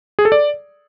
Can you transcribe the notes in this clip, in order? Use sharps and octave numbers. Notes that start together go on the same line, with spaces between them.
G#4
A4
D5